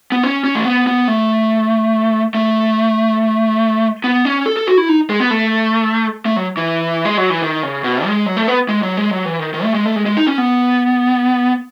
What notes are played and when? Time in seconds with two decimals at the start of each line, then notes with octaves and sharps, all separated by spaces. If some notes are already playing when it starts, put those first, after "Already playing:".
0.12 B3
0.23 C#4
0.44 C#4
0.55 A3
0.65 B3
0.87 B3
1.08 A3
2.34 A3
4.04 B3
4.25 C#4
4.46 A4
4.57 A4
4.67 F#4
4.78 E4
4.89 D#4
5.10 G#3
5.20 B3
5.31 A3
6.26 A3
6.37 F#3
6.57 E3
7.05 G#3
7.17 F#3
7.30 E3
7.42 D#3
7.63 C#3
7.84 B2
8.06 G#3
8.26 F#3
8.37 A3
8.48 B3
8.69 G#3
8.83 F#3
8.97 G#3
9.11 F#3
9.25 E3
9.39 D#3
9.54 D#3
9.63 A3
9.74 G#3
9.85 A3
9.96 G#3
10.06 G#3
10.17 D#4
10.27 C#4
10.38 B3